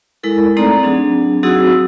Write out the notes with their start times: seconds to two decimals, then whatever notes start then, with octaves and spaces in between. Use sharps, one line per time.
0.23 G#3 E4 A4 A#4
0.57 A3 C4 D#4 A4 D5 A#5
0.83 F#3 C4 D4 G#4
1.43 F#3 C4 D#4 F#4 G#4 E6